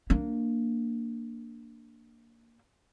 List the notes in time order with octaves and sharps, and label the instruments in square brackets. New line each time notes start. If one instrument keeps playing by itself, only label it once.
[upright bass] A#3 D4